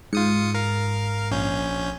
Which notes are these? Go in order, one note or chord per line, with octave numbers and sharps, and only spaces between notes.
G#2 F4 D#6 C#7
A#4 F5
A#1 C#4 G6